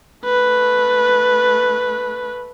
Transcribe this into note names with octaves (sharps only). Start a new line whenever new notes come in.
A3 B4